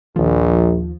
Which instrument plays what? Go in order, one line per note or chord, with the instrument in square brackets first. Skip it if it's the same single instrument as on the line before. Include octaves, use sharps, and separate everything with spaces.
[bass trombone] A#1 [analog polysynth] D#2 F3